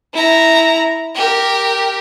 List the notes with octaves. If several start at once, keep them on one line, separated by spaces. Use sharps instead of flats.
E4 A#5
G4 A#4